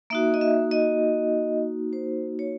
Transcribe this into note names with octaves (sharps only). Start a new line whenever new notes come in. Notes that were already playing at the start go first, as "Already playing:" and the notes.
A#3 D#4 F#4 E5
D#5
E5
D#5
C5
C#5